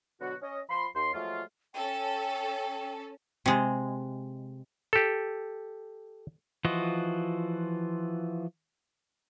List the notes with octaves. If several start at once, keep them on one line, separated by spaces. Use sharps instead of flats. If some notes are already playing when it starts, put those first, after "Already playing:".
B2 D3 F#3 B3 F#4
C#4 D#5
F3 B5 C6
D#2 C6
F3 F#3 G#3 A3 F4
C#4 A4 G5
C3 G#3
G4 A4
E3 F3 F4 F#4 D#5